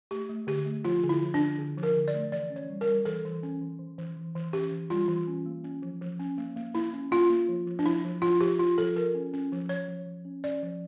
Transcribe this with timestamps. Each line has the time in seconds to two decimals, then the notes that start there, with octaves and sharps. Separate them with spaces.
0.11 A3 G4
0.29 A3
0.47 D3 G4
0.66 A3
0.85 F3 F4
1.03 D3
1.09 E4
1.22 F3
1.34 D4
1.39 D3
1.58 D3
1.77 F3
1.83 A#4
1.96 D3
2.08 D5
2.14 A3
2.32 E3 D5
2.50 C#4
2.56 C#5
2.69 G3
2.81 A#4
2.88 G3
3.05 E3 A4
3.25 E3
3.43 C#4
3.62 E3
3.79 E3
3.98 E3
4.16 E3
4.36 E3
4.53 C#4 G4
4.72 E3
4.90 G3 F4
5.08 E3
5.27 C#4
5.46 A#3
5.64 C#4
5.82 F3
6.01 F3
6.20 C#4
6.38 A#3
6.56 A#3
6.74 A#3 E4
6.93 C#4
7.11 A#3 F4
7.30 A#3
7.49 F3
7.67 F3
7.79 D4
7.86 F3 E4
8.04 F3
8.22 F3 F4
8.41 F3 G4
8.59 F3 F4
8.78 F3 A4
8.96 F3 A#4
9.15 C#4
9.33 C#4
9.52 F3
9.69 F3 C#5
9.88 F3
10.06 F3
10.25 C#4
10.44 C#4 D5
10.63 F3